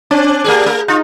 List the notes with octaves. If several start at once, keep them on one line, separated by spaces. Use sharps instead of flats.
C4 D4
D4
A3 G4 G#4
A3
D#4 F4